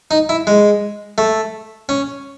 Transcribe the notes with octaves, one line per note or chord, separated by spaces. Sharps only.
D#4
E4
G#3
A3
C#4